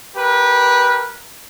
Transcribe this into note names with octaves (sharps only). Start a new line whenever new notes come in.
G4 A#4 B4